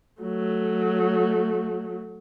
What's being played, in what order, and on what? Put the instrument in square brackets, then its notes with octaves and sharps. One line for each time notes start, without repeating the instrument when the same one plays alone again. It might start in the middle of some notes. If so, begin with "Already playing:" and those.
[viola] F#3 A3